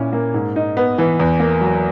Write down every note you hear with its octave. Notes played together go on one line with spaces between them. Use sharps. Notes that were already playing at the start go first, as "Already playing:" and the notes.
Already playing: A#2 C#4 E4
A#3
G#2
D#4
B3
E3
E2
A#3
F#3